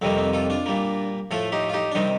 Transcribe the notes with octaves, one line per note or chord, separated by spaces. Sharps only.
F2 C3 D#3 G3 A#3 C4
C4
F4 A4
D4 F4
A#2 G3 A#3
A2 F3 A3 F4 A4
D#4 G4
F4
D#4 G4
D4
C3 D#3 G3 C4 D#4